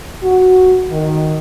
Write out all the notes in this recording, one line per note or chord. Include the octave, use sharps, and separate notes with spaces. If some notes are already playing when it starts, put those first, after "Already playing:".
F#4
D#3